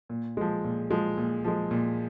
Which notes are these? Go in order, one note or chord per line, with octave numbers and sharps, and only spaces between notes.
A#2
F3 G#3
A#2
F3 G#3
A#2
F3 G#3
A#2